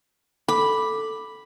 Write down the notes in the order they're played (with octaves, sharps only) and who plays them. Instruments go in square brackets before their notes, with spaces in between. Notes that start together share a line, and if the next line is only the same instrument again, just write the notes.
[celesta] A4 D6 [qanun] B5